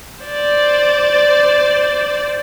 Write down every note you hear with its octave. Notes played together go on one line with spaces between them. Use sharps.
C5 D5